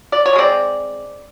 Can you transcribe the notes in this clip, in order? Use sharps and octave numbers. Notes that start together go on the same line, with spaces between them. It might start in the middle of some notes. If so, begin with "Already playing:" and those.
D5
C#5
B2
G#3 C4 D5